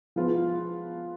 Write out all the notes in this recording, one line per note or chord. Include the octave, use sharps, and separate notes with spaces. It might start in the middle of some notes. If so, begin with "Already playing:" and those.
F3 G#3 B3 F4 B4